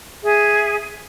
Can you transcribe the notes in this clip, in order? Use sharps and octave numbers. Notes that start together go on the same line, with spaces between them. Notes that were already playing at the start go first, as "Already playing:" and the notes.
G#4 E5